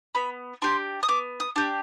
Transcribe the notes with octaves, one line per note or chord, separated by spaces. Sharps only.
B3 B5
D4 G4 C6
D#6
B3 D6
D#6
D4 G4